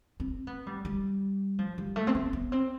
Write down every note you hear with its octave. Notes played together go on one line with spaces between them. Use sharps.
C4
B3
G3
G3
F3
G3
A3
C4
B3
B3
C4